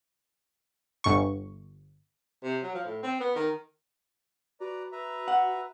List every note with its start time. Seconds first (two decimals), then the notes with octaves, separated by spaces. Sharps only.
1.04 G1 C#6
2.43 C3
2.63 F#3
2.75 F3
2.86 A2
3.03 C4
3.20 B3
3.36 D#3
4.60 F#4 B4 D5 A#5
4.92 B4 E5 A#5
5.28 F#5